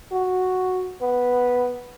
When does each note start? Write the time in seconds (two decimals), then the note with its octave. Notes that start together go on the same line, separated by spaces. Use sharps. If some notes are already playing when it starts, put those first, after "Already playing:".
0.11 F#4
1.01 B3